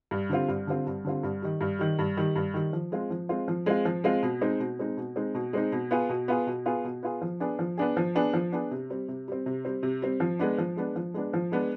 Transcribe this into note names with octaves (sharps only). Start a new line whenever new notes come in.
G2
D3 G3 C4 F4
G2
D3 G3 C4 F4
G2
D3 G3 C4 F4
G2
D#3 G3
G2
D#3 G3
G2
D#3 G3
G2
D#3 G3
F3
G#3 C4 F4
F3
G#3 C4 F4
F3
G#3 C4 F4
F3
G#3 C4 F4
B2
G#3 C4 D#4
B2
G#3 C4 D#4
B2
G#3 C4 D#4
B2
G#3 C4 D#4
B2
B3 F4 G#4
B2
B3 F4 G#4
B2
B3 F4 G#4
B2
B3 F4 G#4
F3
B3 D4 G#4
F3
B3 D4 G#4
F3
B3 D4 G#4
F3
B3 D4 G#4
C3
G3 C4
C3
G3 C4
C3
G3 C4
C3
G3 C4
F3
G#3 B3 D4
F3
G#3 B3 D4
F3
G#3 B3 D4
F3
G#3 B3 D4